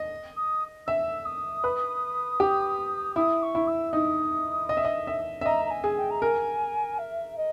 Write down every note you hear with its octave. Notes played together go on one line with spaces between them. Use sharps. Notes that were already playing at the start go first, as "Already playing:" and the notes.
Already playing: D#5
D#6
E5 E6
D#6
B4
G4
E4 D#6
C#6
E4
E6
D#4 D#6
D#5
E5
D#5
E5
E5
D#5 A#5
A#5
G#5
G#4
G5
A#5
A#4 G#5
E5
D#5